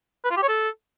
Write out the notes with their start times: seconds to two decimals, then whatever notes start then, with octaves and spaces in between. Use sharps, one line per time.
0.24 B4
0.30 F4
0.36 G4
0.42 C#5
0.49 A4